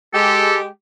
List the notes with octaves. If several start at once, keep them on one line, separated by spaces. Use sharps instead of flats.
G#3 G4 A4